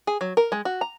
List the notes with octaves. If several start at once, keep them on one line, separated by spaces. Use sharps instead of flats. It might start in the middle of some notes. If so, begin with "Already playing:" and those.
G#4
F#3
A#4
G#3
F#4
A#5